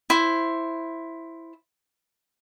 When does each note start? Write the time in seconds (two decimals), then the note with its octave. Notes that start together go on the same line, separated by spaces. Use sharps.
0.10 E4 C5